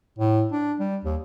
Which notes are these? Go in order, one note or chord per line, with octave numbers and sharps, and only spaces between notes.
A2
D4
G3
D#2